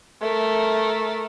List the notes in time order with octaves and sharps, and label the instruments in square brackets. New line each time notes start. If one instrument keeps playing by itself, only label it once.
[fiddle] A3 A#4